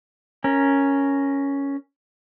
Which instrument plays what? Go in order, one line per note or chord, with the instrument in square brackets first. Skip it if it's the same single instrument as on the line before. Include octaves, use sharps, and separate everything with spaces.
[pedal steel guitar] C#4 A#4